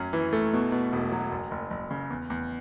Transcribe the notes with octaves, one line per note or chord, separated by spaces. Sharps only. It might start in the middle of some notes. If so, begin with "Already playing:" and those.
Already playing: F#2 C#4 C#6
E3
A3
B2
B2
E1
F#3
F#1
F#1
F#1
C#3
E2
E2